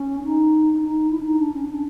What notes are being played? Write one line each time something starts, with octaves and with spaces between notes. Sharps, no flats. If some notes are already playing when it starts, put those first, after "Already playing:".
Already playing: C#4
D#4
D#4
E4
D4
D#4
D4
C#4
D4